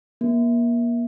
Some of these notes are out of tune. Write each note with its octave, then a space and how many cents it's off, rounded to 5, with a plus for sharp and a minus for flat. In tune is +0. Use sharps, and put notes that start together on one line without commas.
A#3 +35